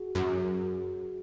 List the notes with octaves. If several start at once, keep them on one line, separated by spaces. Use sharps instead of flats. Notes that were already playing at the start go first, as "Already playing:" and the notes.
Already playing: F#4 G#4
F#2